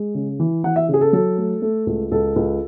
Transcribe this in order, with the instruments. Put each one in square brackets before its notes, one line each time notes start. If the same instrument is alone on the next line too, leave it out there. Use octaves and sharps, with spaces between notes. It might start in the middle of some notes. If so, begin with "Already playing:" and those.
Already playing: [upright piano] G#3
C#3
E3
E3 F#5
E5
C#3 G#4
A4
F#3 A4
A3
A3
C#2
C#2 A4
C#2